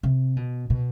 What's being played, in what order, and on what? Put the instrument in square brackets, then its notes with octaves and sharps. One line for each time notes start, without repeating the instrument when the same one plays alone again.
[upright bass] C3
B2
B2